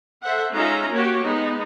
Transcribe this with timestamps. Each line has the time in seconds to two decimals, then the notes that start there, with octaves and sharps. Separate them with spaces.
0.23 A4 C5 E5 F#5
0.53 G#3 C#4 D#4 F4 E5 A#5
0.92 A#3 F#4 G4 C#5
1.24 G#3 B3 D#4